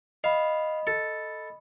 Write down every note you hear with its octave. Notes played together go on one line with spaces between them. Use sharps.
D#5 F5 B5
A4